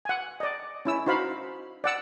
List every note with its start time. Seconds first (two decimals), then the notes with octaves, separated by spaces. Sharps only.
0.05 F#5 G#5
0.40 D5 D#5
0.85 C#4 E4 E6
1.06 D#4 F#4 C5 F5 B5
1.84 D5 F#5 E6